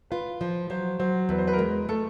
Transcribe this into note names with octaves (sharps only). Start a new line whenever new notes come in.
F4 B4
F3 C5
F#3 C5
F#3 C5
E2 B4
C5
B4
A#4
G#3 B4
A3 A4